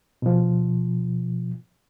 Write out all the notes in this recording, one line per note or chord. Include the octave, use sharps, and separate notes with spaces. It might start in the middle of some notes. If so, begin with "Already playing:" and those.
B2 F3